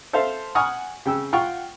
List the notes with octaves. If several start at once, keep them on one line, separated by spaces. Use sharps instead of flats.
A4 C5 E5 F5
F#5 G#5 C#6 D#6 F6
C#3 G5 E6
F4 F#5 G5 C#6 F6